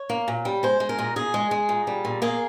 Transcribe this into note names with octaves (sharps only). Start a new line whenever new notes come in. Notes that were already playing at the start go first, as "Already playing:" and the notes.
Already playing: C#5
A#3
A#2
G3
G#3 C5
G#3
A#4
A#2
A#2 G#4
G#3
G#3
A#2
G3
A#2
A#3 G#4